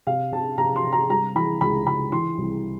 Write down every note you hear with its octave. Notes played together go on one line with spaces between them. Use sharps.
C3 F5
C3 A5
C3 A#5
C6
C3
A#5
G3 A#5
E3 B5
C#2 B5
C#2 B5
E3 C6
C2